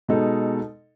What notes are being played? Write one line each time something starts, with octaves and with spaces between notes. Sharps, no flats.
B2 G#3 D#4 A4